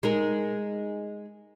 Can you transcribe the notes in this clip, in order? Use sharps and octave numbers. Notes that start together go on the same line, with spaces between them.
G#3 D#4 A#4